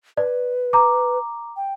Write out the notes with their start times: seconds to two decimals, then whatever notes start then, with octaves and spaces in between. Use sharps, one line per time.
0.17 B4 D5
0.73 A#5 D6
1.57 G5